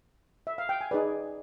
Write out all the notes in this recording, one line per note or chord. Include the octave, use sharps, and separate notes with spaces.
E5
F5
G5
G#5
D#4 G#4 B4 D5